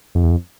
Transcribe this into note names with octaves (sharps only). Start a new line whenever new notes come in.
F2
E2
F2